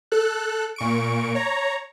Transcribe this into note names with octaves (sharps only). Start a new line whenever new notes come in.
A4 F#6
A#2 C#6 D7
C#5 A#5